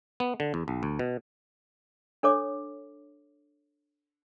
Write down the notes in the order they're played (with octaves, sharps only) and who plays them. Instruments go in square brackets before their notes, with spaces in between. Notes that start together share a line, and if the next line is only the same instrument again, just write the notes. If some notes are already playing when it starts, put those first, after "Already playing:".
[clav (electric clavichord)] B3
D3
E2
B1
D2
B2
[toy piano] D4 A4 C#5 D6